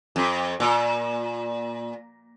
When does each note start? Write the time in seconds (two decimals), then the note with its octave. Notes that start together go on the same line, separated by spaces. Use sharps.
0.16 F2
0.60 A#2